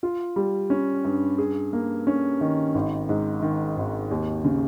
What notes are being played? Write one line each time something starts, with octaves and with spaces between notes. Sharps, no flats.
F4
G3
C#4
G2
G#4
A#3
C#4
D#3
G#1
G#2
D#3
G#1
D#2
C#3